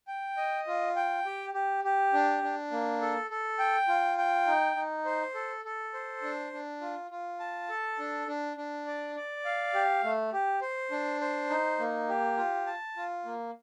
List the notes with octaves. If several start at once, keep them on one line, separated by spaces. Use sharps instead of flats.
G5
D#5
F4
G5
G4
G4
G4
D4
D4
A#3
A4
A4
G5
F4
G5
D#4
D#4
C5
A4
A4
C5
D4
D4
F4
F4
A5
A4
D4
D4
D4
D5
D5
F5
G4
A3
G4
C5
D4
C5
D#4
A#3
G4
F4
A5
F4
A#3